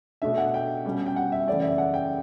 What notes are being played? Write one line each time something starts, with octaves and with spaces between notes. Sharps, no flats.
B2 A3 D4 E5
F#5
G5
B2 G3 C#4
G5
F#5
E5
F#2 C#3 E3 A3 C#4 D5
E5
F#5
G5